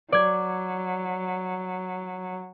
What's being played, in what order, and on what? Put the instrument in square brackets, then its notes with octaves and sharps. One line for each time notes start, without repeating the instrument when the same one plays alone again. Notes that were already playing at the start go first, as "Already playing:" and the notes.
[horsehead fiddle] F#3 [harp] D5 G#6